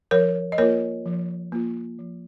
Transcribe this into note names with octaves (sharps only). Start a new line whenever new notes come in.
F3 A#4 C#5
D#5
A#3 F4 A#4 C#5
F3
A#3 F4
F3